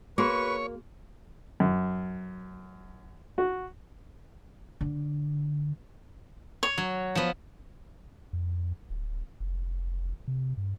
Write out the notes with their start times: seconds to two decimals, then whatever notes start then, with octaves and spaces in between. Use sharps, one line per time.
0.18 A#3 F#4 G#4 B4 C#5 C#6
1.60 F#2
3.38 F#4
4.81 D3
6.63 C#5
6.78 F#3
7.15 F3 B3
8.33 F2
8.90 D1
9.40 F1
10.28 C3
10.57 G2